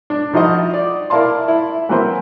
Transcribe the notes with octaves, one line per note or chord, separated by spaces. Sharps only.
D4
F3 D#4 E4 F#4 C5 D#5
D5
E4 A#4 D5 F5 A5 C6
E4
E3 F#3 A#3 C4 B4 C5